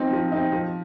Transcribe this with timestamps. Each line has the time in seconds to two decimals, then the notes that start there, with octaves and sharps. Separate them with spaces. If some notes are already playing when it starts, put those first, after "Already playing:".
Already playing: F3 C4 D#4
0.13 F3
0.32 C4 D#4
0.52 F3